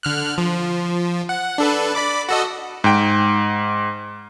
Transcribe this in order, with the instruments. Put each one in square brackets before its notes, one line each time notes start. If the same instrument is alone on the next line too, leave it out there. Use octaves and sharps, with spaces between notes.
[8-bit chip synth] D3 F6 F#6
F3
F#5
D4 A4 B4
D5 B5 D6
F#4 A4 D#5
[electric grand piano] G#2 G5